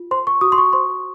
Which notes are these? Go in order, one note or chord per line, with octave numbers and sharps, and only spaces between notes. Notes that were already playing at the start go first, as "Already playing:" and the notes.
Already playing: F4
C5 C6
C#6
F#4 D#6
C6
C#6
C5 C6